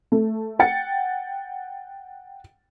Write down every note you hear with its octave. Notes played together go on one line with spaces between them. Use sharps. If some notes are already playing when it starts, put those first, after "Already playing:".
A3
F#5 G5 A6 C#7